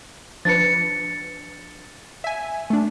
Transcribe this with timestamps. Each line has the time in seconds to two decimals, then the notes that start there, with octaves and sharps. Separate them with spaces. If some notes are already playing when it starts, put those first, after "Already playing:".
0.45 F3 D4 B4 A6 C#7
2.24 E5 G#5
2.70 A3 D4